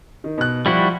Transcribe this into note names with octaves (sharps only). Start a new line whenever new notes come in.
D#3
B2 F#6
F3 G3 E4 F#4